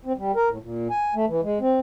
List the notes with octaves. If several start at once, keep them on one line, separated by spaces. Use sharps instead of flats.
C4
G3
A#4
A2
A#2
G#5
A3
E3
G#3
C4